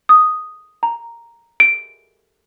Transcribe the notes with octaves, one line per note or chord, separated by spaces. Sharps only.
D#6
A#5
D7